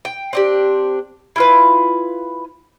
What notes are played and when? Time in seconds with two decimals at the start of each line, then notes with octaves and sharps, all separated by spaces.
0.05 G5
0.33 C4 D4 G4
1.36 E4 F4 B4